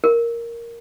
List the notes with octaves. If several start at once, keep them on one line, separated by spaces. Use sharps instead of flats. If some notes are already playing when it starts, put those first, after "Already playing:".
A#4